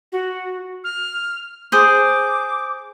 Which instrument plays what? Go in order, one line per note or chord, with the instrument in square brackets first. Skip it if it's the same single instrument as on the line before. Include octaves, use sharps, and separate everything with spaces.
[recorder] F#4
F6
[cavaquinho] G#4 C5 [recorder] D6